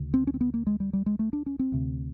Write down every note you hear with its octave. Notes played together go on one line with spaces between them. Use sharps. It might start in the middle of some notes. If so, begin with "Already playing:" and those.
Already playing: D2 C#3
C4
C#4
C4
B3
A#3
G#3
G3
G3
G#3
A3
D4
C#4
C4
D2 C3